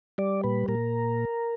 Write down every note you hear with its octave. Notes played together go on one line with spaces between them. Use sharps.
G3 D5
A#2 B4
A#2 A#4